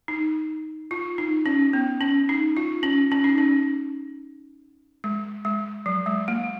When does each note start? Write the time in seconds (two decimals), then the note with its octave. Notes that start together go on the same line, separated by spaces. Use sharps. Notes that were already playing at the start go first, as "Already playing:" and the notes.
0.08 D#4
0.91 F4
1.18 D#4
1.46 C#4
1.73 B3
2.01 C#4
2.29 D#4
2.57 F4
2.83 C#4
3.12 C#4
3.24 D#4
3.38 C#4
5.04 G#3
5.45 G#3
5.86 F#3
6.06 G#3
6.28 A#3